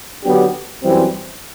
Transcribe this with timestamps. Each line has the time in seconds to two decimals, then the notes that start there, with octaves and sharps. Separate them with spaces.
0.24 D3 F#3 B3 D4 G4
0.83 F#2 E3 G3 C4